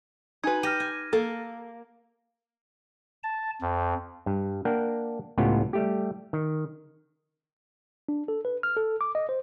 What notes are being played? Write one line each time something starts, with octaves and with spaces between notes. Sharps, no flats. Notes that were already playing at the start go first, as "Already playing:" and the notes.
D#4 F#4 B4 G#5 G#6
G4 F6 A#6 D#7
G#5
A#3 A4
A5
F2
G2
A#3 D4 A#4 F#5 G5
C#2 A2 B3 C#4 F4 G4
G3 A3 G4
D#3
D4
A4
B4
F6
A4
D6
D#5
C5